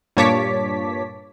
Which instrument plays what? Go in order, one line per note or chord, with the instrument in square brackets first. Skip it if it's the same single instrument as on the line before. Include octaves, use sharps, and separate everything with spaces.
[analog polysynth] G2 A#2 C#5 A5 D6 B6